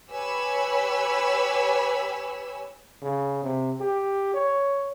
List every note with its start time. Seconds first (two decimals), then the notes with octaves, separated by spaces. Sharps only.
0.11 G4 B4 C#5 G#5 B5 E6
3.02 C#3
3.43 C3
3.80 G4
4.34 C#5